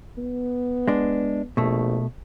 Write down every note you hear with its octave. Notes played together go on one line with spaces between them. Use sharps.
B3
G#3 D4
A#1 B2 A3